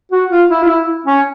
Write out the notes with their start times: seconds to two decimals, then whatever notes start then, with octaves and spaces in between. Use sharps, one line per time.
0.12 F#4
0.30 F4
0.49 E4
0.63 F4
0.68 E4
1.06 C#4